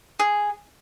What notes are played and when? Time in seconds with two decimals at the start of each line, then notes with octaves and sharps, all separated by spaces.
0.19 G#4